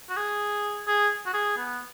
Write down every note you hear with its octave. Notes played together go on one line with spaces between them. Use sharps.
F#4
G#4
G#4
F#4
G#4
B3